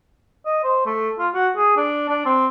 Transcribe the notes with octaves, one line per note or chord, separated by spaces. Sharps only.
D#5
C5
A3
F4
F#4
G#4
D4
D4
C4